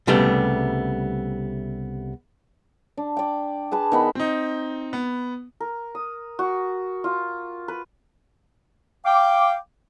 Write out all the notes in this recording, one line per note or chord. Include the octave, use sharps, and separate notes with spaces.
C2 C#3 G3 A3 B3 G4
D4
D5 G5
G#4 B4 A5
D#3 B3 B5
C4 D#4
B3
A#4
D#6
F#4
F4
B4
F5 G5 D6